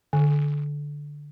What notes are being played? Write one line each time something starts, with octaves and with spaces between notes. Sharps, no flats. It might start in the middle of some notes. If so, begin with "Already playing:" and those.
D3